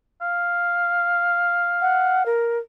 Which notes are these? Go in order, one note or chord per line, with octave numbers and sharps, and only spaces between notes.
F5
F#5
A#4